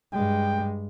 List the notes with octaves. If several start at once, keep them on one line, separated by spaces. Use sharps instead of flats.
G2 G#3 G5